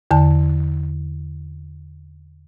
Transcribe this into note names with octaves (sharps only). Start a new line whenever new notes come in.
E2 D3 A5